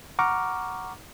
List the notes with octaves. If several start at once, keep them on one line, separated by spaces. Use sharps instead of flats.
F#5 A#5 C#6 D6 F6